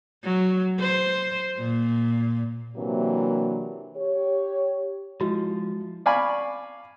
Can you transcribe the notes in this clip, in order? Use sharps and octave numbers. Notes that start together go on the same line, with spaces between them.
F#3
C5
A#2
C3 E3 F#3 A#3 D4
G4 C#5
F3 G#3 E4 F#4
D5 F5 G#5 B5 C#6